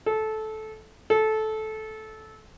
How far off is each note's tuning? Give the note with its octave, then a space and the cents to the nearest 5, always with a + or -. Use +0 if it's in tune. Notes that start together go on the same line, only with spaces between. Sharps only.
A4 -15
A4 -15